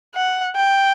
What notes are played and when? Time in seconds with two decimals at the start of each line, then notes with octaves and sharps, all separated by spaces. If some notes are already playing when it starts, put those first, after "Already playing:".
0.15 F#5
0.56 G5